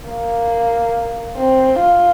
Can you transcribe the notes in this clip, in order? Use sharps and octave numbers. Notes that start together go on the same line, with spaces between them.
A#3
C4
F4